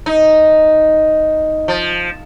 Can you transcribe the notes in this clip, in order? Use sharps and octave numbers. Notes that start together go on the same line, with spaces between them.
D#4
F3